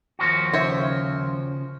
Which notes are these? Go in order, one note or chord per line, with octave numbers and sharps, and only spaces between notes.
D#2 F3 F#4
C#3 C5 C#5 E5